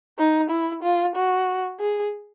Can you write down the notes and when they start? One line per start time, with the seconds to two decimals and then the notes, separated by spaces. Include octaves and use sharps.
0.18 D#4
0.50 E4
0.83 F4
1.15 F#4
1.80 G#4